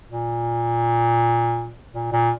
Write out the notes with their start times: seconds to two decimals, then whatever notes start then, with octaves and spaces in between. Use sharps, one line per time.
0.09 A#2
1.93 A#2
2.12 A#2